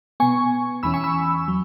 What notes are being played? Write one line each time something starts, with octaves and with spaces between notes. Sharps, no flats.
B2 B3 G#5 C#6
E2 E3 C#4 B5 E6
G#5 C#6
B5 E6
F#3